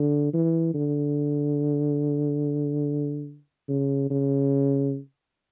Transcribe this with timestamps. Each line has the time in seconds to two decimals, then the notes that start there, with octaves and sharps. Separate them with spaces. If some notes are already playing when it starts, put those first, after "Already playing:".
Already playing: D3
0.33 E3
0.74 D3
3.69 C#3
4.10 C#3